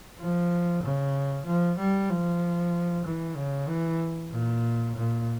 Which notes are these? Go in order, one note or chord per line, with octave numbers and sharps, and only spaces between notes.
F3
C#3
F3
G3
F3
E3
C#3
E3
A#2
A#2